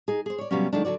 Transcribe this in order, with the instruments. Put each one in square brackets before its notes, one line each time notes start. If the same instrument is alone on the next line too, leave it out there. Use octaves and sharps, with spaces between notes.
[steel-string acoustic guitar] D#4 G#4
G#4 C5
C#5 D5
C3 F#3 G3 A#3 B3 C#4
D#3 F#3 G#3 A3 D4
D3 F#3 F#4 D5